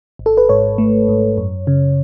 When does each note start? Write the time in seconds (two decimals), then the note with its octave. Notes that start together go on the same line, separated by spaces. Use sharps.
0.19 G#1
0.26 A4
0.37 B4
0.49 G#2 C#5
0.78 A3
1.08 G#2
1.37 F#2
1.67 C#3